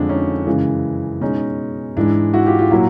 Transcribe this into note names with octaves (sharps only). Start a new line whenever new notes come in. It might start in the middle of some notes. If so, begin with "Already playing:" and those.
Already playing: F2 D3 F3 G#3 D4
C#4 D#4
F#2 C#3 E3 G#3
B2 G#3 C#4 D#4
G#2 E3 G#3 D4 E4
E4 F#4
F4 G4
F4 G4
A#2 F#3 A#3 E4 F#4